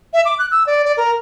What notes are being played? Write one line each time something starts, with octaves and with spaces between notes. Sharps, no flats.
E5
D6
F#6
E6
D5
D5
A#4